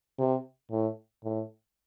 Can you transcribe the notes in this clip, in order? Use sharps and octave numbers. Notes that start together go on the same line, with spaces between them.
C3
A2
A2